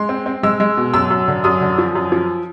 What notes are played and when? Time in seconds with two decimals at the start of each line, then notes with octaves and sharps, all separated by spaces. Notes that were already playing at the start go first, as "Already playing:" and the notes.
Already playing: G#3 C6
0.09 C4
0.26 C4
0.43 G#3 E6
0.60 G#3
0.77 B2
0.93 F#2 E6
1.10 F#2
1.28 D3
1.44 F#2 D#6
1.61 D3
1.78 F3
1.95 F#2
2.12 F3